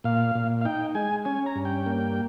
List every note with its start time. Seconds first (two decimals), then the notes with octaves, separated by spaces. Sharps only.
0.04 A#2 F5
0.35 A#2
0.61 F5
0.65 D#4 G5
0.95 G#3 G#5
1.25 C#4 G#5
1.46 A#5
1.56 G2
1.65 G5
1.86 A#3